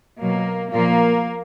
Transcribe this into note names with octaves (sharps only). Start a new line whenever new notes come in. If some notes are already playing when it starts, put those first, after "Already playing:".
B2 F#3 A#3
A#2 F3 A#3